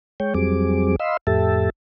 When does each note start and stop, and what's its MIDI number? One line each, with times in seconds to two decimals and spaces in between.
0.20 0.34 56
0.20 0.34 73
0.20 0.34 79
0.34 0.96 41
0.34 0.96 54
0.34 0.96 55
0.34 0.96 60
0.34 0.96 68
0.34 0.96 86
1.00 1.17 75
1.00 1.17 77
1.00 1.17 83
1.00 1.17 84
1.00 1.17 88
1.27 1.70 41
1.27 1.70 45
1.27 1.70 67
1.27 1.70 69
1.27 1.70 76
1.27 1.70 81